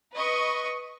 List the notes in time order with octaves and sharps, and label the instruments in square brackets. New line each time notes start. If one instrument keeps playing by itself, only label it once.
[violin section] B4 D#5 C#6